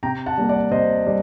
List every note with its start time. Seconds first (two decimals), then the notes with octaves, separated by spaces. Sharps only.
0.03 C3 G5 A#5
0.26 F#5 A5
0.37 G3 A#3
0.49 D5 F#5
0.71 C3 C5 D#5
1.06 G3